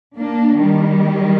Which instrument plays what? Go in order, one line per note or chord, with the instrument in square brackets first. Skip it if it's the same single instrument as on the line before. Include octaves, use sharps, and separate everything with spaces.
[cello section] A#3 D4
D#3 G3